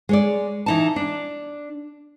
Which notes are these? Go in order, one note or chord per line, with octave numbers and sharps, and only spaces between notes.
G#3 C#5 D5
E3 D#4 A5
D4